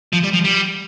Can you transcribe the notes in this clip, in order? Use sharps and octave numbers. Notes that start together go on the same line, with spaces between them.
F3
G3
F3
G3